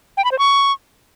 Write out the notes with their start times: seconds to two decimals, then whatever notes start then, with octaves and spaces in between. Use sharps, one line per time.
0.17 G5
0.24 B5
0.32 C5
0.39 C#6